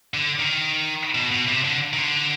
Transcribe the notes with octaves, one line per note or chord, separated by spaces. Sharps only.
D3
D#3
B2
B2
C3
D3
D#3
D3